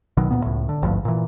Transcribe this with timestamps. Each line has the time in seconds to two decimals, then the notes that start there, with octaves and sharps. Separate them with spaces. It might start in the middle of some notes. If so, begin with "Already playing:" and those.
0.17 B1 B2 D#3 F#3
0.31 D2 A#2 B3
0.44 C#2 A2
0.69 D3
0.82 G#1 D2 G2 F3
1.05 A#2 E3